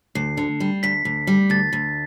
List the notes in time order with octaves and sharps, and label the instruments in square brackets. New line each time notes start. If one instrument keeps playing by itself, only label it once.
[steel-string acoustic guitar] D2 [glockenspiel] C7
[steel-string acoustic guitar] D3
G3
[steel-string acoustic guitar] D2 [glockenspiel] B6
[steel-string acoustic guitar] D2
G3
[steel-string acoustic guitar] D2 [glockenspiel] A6
[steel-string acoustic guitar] D2